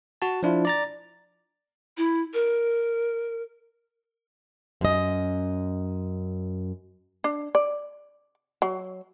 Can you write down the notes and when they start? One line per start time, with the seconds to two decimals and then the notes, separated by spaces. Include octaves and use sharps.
0.22 F#4 A5
0.43 F3 D4 E4 F4
0.65 D5 A#5 A6
1.97 E4
2.34 A#4
4.81 F#2 D#5
7.24 D4
7.55 D5
8.62 F#3